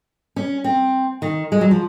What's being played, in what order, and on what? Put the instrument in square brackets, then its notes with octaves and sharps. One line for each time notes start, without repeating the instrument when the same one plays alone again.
[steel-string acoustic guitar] C#4
C4
D#3
G#3
F#3
F3